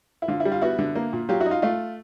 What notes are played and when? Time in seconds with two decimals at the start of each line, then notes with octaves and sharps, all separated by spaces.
0.22 E4
0.28 D3 F4
0.40 E4
0.45 G3
0.52 F4
0.62 B3 E4 F#4
0.79 D3
0.95 A#3
1.13 A#2
1.29 F#3 F4 G4
1.40 E4 F#4
1.46 D#4
1.51 F4
1.62 A3 F4